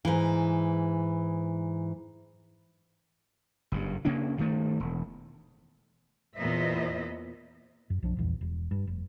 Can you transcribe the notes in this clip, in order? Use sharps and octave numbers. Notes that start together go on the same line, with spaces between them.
G#2 E3
F#1 G2
C#3 A#3 C#4 D4
G2 D#3 A3
E1
E2 A#2 B3 C5 D#5 E5
F#2
B1 F3 D4
D#1 A#1 E2 G2
E1
G2
F1